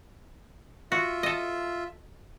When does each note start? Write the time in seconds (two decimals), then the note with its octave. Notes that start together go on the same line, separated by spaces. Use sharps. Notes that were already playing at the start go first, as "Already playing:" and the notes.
0.92 F4 F#4 E5
1.23 A4 D#5